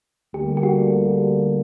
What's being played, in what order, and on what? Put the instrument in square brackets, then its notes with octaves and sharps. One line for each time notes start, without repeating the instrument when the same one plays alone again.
[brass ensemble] D2 D3 G3 A#3 [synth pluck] G4
[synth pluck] G4
F#4